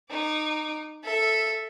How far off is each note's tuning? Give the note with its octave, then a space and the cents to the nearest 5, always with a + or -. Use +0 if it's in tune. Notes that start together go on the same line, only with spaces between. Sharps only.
D#4 -20 D6 +0
A4 +0 E5 -5